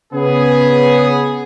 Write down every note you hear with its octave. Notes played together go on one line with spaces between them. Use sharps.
C#3 B3 G#4